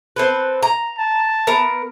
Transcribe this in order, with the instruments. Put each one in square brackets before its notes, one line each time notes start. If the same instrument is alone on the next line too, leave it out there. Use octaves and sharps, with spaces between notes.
[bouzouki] C4 A4 B4
A#5
[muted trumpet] A5
[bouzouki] B3 A#4